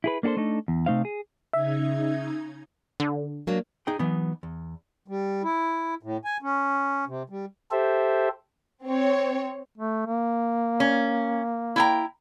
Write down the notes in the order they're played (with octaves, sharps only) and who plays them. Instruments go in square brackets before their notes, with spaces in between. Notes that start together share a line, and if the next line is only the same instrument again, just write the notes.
[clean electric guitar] E4 G#4 B4
A#3 D4 F#4 A4 C5
A3 D4 D#4 A4
E2
C3 A3 D#4 C5 F5
G#4
[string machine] C#3 D#4 G#6 [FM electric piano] E5
[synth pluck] D3
[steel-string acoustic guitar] F#3 A#3 D4
[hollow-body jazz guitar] D#4 G#4 G5
E3 F#3 B3 D#4
E2
[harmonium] G3
E4
A2
G#5
C#4
C3
G3
[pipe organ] G4 A4 C5 E5
[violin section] C4 C#5
[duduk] A3
A#3
[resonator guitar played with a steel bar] C#4
E4 G5 A#5